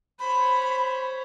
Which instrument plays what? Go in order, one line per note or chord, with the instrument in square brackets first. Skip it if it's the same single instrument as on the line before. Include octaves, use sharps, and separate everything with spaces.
[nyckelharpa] C5 C#5 [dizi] B5